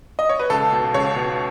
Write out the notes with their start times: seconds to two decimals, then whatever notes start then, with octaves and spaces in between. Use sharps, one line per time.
0.19 D#5
0.29 C#5
0.39 B4
0.50 C#2 A4
0.72 B2
0.94 C#2 C#5
1.16 B2